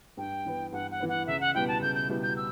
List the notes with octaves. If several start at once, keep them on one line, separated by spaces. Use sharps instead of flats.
G2 G5
E3 B3
G2 F#5
F#5
E3 B3
F#5
C#2 E5
F#5
B2 G3 B3 E4 G5
A5
C#2 G6
G6
B2 G3 B3 E4
G6
E6